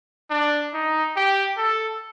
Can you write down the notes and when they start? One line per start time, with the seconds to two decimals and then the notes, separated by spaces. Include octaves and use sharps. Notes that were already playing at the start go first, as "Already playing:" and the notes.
0.30 D4
0.74 D#4
1.16 G4
1.57 A4